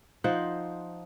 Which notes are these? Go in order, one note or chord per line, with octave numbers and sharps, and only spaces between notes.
F3 D#4 C5 F#5